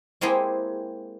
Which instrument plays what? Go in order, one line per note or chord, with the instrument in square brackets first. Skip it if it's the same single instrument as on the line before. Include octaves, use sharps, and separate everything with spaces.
[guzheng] G#3 A#3 C4 E4 G4 G#4